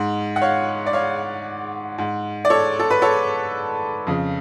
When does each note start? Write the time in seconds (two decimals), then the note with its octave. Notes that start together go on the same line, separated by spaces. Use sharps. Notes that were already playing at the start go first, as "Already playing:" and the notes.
Already playing: G#2
0.36 F#5
0.41 C#5 F5
0.86 D5
0.93 C#5 F5
1.98 G#2
2.45 D5
2.50 A4 C#5
2.80 A4
2.91 B4
3.02 A4 C#5
4.07 F2 C#3